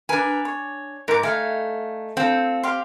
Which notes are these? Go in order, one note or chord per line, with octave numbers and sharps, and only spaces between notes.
D4 A#4 B4 G#5
C#5
G#2 A#4 D6
A3 D#4 F5 G#5
C4 F4 A4
G4 F5 C6